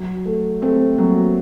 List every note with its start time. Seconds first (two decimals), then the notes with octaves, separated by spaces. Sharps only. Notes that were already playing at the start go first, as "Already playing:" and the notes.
Already playing: F#3
0.26 A3
0.62 A3 C4
0.98 F#3 A#3